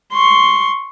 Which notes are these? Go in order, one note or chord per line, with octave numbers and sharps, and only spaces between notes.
C6 C#6